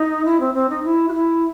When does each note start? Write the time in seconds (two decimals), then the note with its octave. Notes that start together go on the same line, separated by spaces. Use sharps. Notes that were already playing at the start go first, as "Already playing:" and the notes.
Already playing: D#4
0.25 E4
0.40 C4
0.54 C4
0.70 D#4
0.84 E4
1.09 F#4
1.14 E4